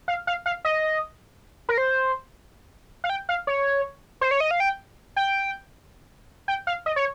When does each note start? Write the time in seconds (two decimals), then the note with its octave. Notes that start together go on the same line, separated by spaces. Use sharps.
0.08 F5
0.27 F5
0.46 F5
0.65 D#5
1.69 A#4
1.78 C5
3.04 F5
3.10 G5
3.29 F5
3.47 C#5
4.21 C5
4.31 C#5
4.40 D#5
4.51 F5
4.60 G5
5.16 G5
6.48 G5
6.67 F5
6.86 D#5
6.96 C#5